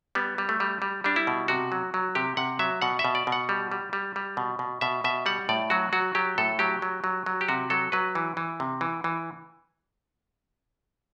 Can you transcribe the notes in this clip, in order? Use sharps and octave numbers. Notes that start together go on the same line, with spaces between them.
G3 B3
G3
A3
G3
G3
G3 D4
E4
B2
C3 F#4
F#3
F#3
C3 G4
C3 F#5
F#3 E5
B2 F#5
E5
B2
D5
B2
F#5
G3
G3
G3
G3
B2
B2
B2 E5
B2 E5
G3 F#5
A2 D5
F#3 F#4
F#3 F#4
F#3 G4
A2 A4
F#3 G4
F#3
F#3
F#3
G4
C3 F#4
F#3 A4
F#3 B4
E3
E3
C3
E3
E3